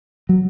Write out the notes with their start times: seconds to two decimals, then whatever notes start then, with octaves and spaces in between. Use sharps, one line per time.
0.29 F#3